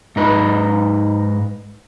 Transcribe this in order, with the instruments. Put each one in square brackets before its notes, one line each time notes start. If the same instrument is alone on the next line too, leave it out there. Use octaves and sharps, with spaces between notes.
[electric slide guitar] G#2 D#4 B4